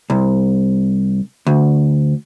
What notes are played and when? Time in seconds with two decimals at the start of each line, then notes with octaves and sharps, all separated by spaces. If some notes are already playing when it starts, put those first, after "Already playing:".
0.10 C2
1.47 D2